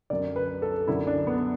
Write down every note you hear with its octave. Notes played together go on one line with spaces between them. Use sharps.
F#2 D3 D5
B4
A4
F#2 D3 E4
D4
B3